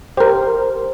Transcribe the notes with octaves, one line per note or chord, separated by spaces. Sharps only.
G4 A#4 C5